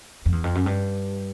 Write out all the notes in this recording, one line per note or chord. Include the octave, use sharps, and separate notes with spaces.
F2
E2
F2
F#2
G2